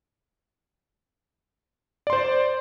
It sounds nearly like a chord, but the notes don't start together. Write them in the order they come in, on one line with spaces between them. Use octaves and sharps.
D5 C6 C5